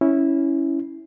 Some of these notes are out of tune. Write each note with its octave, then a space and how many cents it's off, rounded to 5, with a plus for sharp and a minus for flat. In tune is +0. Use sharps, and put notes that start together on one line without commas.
C#4 +0 E4 -15